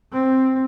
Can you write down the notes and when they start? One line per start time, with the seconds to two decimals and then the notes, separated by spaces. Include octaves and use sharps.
0.13 C4